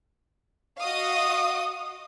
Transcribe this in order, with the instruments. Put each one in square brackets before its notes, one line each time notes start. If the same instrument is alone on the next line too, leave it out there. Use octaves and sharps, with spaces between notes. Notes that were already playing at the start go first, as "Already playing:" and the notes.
[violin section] F#4 D#5 F5 D#6